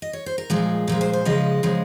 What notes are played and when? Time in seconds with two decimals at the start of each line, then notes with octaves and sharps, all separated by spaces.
0.02 D#5
0.13 C#5
0.26 C5
0.38 A#4
0.50 A#2 F3 G#3 G#4
0.87 A#2 F3 G#3 A#4
1.01 C5
1.13 C5
1.25 C#3 F3 G#3 D#5
1.63 C#3 F3 G#3